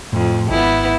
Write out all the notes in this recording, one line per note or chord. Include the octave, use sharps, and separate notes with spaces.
F2 A2
G#1 B3 E4